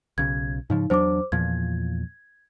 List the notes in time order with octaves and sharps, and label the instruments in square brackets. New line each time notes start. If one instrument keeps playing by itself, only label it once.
[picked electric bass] B1 C#3 [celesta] G#6
[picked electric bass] G#2 C#3 F3 [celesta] D#4
[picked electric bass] E2 F#3 D4 [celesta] C5 D6
[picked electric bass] E2 A#2 F3 [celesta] G#6